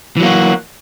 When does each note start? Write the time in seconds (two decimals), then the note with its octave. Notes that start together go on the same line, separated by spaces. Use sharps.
0.17 E3
0.20 F#3
0.23 A#3
0.26 F#4